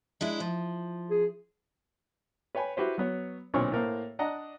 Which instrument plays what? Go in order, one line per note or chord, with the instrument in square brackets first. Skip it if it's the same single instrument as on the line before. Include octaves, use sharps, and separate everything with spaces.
[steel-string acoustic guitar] G#3 D4 E4
F3
[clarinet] G#4
[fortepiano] B4 C#5 G5 G#5 B5
E4 F#4 G4 B4 C5
F#3 B3 C#5
B1 A#2 D3 C4 C#5 C#6
A2 A#3 C5
D4 D5 D#5 F#5 A#5